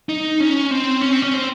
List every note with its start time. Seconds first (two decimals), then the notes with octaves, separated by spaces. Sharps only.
0.09 D#4
0.40 C#4
0.71 C4
1.01 C#4
1.13 C4
1.22 C#4
1.33 C4